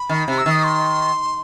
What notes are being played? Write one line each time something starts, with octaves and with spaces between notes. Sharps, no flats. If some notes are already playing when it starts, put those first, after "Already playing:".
Already playing: B5
D#3
C3
E6
D#3
D#6
C6